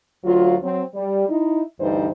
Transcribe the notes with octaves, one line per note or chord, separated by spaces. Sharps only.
D2 F#3 F4
F#3 C4
G3
D#4 E4
D2 G2 E3 D#4 C5